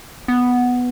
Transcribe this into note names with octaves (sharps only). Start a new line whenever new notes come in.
B3